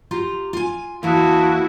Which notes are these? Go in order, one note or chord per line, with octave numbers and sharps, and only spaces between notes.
F4 G4 A#5
F4 G#5
E2 A#3 E4 F#4 F5 A5 D#6